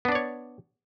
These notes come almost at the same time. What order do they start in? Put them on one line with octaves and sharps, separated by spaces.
B3 D4 D5 C#5